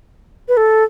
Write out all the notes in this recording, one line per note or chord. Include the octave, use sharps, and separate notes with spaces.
B4
A4